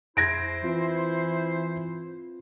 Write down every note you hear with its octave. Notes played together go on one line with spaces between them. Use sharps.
F2 E4 C5 G#6 A#6 D7
E3 C4 F4